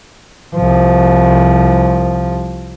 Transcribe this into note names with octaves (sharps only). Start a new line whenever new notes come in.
C2 F3